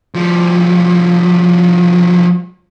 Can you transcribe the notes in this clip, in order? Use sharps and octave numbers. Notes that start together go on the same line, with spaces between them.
F3 G3